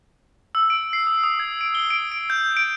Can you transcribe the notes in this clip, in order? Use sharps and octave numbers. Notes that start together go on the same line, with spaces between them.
E6
D7
C7
D#6
D#6
G#6
D7
G7
D7
D7
G6
D7